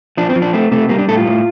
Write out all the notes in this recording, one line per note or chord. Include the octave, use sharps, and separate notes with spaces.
F3 D4
C4
F3
D4
A3 C4
C3 A3
G3 A#3
D4
A2 A4
F4
A2